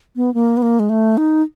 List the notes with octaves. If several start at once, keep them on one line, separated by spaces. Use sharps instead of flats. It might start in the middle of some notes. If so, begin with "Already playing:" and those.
B3
A#3
B3
A#3
G#3
A3
D#4